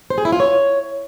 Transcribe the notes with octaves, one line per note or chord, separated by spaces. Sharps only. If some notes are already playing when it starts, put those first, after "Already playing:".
C5
G#4
E4
F4
C#5